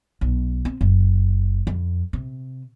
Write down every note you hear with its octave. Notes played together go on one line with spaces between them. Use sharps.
B1
C4
F#1
F2
C3